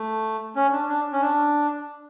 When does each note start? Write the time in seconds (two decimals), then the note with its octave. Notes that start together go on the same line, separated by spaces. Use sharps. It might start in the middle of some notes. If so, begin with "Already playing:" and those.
Already playing: A3
0.55 C#4
0.72 D4
0.89 D4
1.13 C#4
1.22 D4